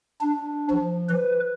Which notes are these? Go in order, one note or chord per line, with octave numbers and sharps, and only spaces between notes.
D4
F3
B4